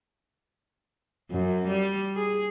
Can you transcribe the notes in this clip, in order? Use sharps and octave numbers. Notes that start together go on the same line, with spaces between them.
F#2
G3
G#4